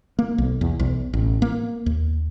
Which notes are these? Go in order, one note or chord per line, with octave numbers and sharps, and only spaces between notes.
A#3
B1
E2
B1
A1
A#3
D#2